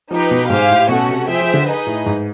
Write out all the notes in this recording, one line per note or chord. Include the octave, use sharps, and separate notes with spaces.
F3 D#4 G4 B4
B2
G#2 G4 C5 F5 G#5
A2
B2 A3 C#4 F#4
C3
F3 G#4 C5 E5 G5
F3
D3
D#4 G#4 B4 D#5
A2
G#2